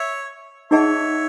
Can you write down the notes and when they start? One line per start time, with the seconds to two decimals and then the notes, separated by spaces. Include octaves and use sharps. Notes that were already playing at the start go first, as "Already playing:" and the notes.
Already playing: C#5 E5
0.71 D#4 G#4 C#5 D#5 E5 F#5 A5